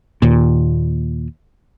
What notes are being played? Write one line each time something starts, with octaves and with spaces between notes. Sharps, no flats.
D#2 A#2